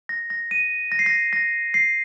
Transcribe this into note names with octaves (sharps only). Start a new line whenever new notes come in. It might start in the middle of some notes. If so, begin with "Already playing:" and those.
A#6
A#6
D#7
A#6
C7
A#6
A#6
C7